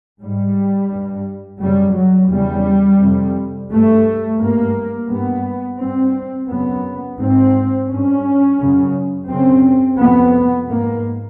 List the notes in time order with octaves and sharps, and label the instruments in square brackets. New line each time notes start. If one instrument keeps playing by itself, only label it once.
[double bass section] G#2 G3
G2
F#2 C#3 G3
F#3
E2 C#3 G3
F2 C3
G2 A3
G2 A#3
G2 B3
G2 C4
F#2 C#3 B3
G#2 C4
G2 C#4
F#2 C#3
F#2 C#3 C4
F2 C3 B3
G#2 A#3